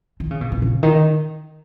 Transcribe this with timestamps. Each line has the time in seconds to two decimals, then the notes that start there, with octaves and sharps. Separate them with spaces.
0.20 D#3
0.31 C#3
0.41 B2
0.52 B2
0.62 C#3
0.83 D#3